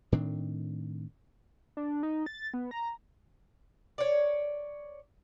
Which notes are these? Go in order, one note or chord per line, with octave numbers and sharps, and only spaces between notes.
A2 D#3 C4 D4
D4
D#4
A6
B3
A#5
C#5 D5